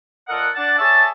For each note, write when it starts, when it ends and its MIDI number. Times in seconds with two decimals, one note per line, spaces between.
0.28 0.48 46
0.28 0.48 69
0.28 0.48 70
0.28 0.48 75
0.28 0.48 78
0.55 0.77 62
0.55 0.77 74
0.55 0.77 78
0.55 0.77 81
0.79 1.08 68
0.79 1.08 69
0.79 1.08 73
0.79 1.08 74
0.79 1.08 76
0.79 1.08 81